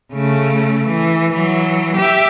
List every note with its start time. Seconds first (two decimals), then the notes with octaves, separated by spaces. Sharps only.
0.12 C#3 A3
0.88 E3
1.33 E3 F#3
1.96 G4 E5